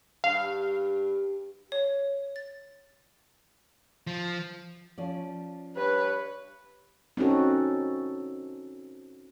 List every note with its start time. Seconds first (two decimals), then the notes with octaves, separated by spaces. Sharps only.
0.24 G2 F5
1.72 C#5
2.36 A6
4.07 F3
4.98 F3 C#4 D5
5.76 G2 B4 C#5
7.17 C4 C#4 D#4 F#4 A4